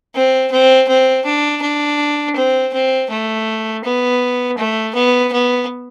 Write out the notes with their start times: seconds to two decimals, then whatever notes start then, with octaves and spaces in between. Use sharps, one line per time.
0.14 C4
0.51 C4
0.88 C4
1.25 D4
1.62 D4
2.36 C4
2.73 C4
3.10 A3
3.84 B3
4.58 A3
4.95 B3
5.32 B3